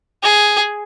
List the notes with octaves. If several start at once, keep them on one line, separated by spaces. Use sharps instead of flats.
G#4